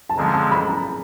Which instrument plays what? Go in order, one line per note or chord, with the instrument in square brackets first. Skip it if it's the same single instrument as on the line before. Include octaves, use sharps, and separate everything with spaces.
[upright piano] A5
[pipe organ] D3 F3 G#3 C4 [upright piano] A#5
[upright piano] A#5
A5
B5
A#5